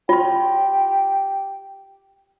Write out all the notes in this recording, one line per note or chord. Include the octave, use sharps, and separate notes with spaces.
F4 G4 C6